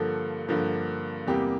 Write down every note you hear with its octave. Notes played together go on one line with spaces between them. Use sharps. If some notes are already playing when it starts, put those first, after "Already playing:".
Already playing: G2 D3 F3 A#3 A4
G2 D3 F3 A#3
E2 C3 G3 A#3 G4